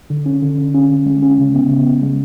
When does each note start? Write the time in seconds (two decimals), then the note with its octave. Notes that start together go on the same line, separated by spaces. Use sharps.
0.10 D3
0.26 C#4
0.42 D3
0.57 D3
0.74 C#4
0.90 D3
1.06 G#3
1.22 C#4
1.38 C#3
1.54 B3
1.70 C#3
1.86 B3
2.02 G#3